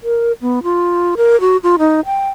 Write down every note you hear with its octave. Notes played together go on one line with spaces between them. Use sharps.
A#4
B3
F4
A#4
F#4
F4
D#4
G5